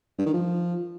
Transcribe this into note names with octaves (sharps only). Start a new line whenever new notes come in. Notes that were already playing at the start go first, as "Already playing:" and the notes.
G2
D#3
F3